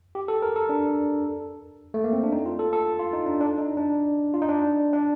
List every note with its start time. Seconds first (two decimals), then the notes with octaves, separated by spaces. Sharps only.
0.15 G4
0.28 A4
0.42 A#4
0.56 A4
0.69 D4
1.94 A3
2.04 A#3
2.13 C4
2.23 D4
2.32 D#4
2.46 F4
2.59 A4
2.73 A4
2.99 F4
3.13 D#4
3.26 D4
3.40 D4
3.58 D#4
3.77 D4
4.34 F4
4.42 D#4
4.49 D4
4.93 D4